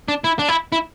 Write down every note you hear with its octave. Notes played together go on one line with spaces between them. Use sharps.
D4
E4
D4
E4
E4